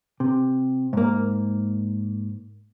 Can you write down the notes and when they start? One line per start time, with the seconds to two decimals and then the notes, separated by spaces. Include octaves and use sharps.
0.20 C3
0.93 G#2 A#3